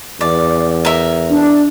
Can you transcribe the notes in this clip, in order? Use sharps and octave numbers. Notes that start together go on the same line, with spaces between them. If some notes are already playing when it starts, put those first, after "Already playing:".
E2 D5
A#4 E5
D4